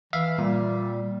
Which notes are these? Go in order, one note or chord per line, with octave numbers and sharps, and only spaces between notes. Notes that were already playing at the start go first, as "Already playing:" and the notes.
E3 E5 F5
A#2 G3